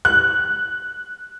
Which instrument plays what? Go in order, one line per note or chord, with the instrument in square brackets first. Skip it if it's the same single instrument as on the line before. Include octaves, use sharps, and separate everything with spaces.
[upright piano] F#6